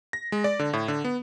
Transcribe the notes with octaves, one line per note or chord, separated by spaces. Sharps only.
A#6
G#3
D5
D3
A2
D3
B3